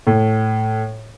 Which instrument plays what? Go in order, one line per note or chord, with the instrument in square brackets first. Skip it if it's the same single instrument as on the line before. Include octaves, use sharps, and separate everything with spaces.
[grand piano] A2